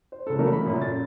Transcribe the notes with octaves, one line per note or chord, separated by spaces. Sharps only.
C5
C#2 A4
C#3 E3 F#3 A3 A#3 A#4
B5
F#2 A#2 C#3
A6